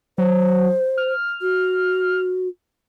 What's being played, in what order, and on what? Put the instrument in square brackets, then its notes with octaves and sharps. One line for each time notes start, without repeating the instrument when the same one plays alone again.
[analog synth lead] F#3 [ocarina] C5
[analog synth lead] F6
[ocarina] F#4